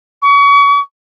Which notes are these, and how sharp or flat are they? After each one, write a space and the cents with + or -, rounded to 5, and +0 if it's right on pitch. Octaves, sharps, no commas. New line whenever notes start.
C#6 +35